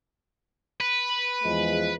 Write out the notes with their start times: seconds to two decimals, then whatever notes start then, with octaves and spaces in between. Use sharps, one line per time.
0.81 B4
1.44 E2 F3 G#3